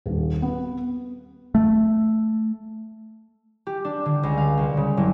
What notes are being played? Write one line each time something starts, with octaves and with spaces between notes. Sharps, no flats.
D#1
B3
A3
G4
D4
D3
C#2
F5
C2
C#3
F#1